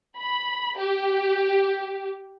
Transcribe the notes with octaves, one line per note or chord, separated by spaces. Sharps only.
B5
G4